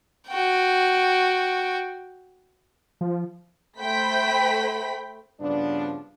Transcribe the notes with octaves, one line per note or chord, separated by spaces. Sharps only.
F#4 G5
F3
A3 C5 G5 B5 B6
G2 C#3 F3 B3 D4